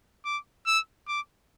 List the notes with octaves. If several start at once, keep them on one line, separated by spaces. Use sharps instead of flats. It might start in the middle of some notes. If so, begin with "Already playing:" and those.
D6
E6
D6